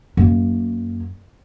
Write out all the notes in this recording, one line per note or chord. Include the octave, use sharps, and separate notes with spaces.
F#2 A#3